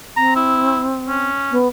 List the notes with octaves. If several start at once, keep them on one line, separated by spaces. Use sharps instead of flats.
C4 A#5
E4
C#4
B3